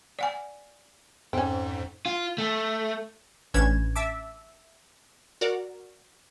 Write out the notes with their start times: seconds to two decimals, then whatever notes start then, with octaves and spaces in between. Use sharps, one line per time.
0.19 D5 F#5 G#5
1.33 F2 G#2 C4 C#4
2.06 F4
2.38 A3
3.54 A1 C#4 D4 B4 G#6 E7
3.96 E5 A5 D6
5.41 F#4 A#4 D5